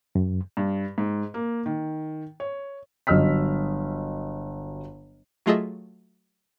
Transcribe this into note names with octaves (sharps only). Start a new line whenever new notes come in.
F#2
G2
G#2
A#3
D#3
C#5
G1 F#3 D#5 E6 F6 B6
F#3 A3 F4 G#4 D#5 E5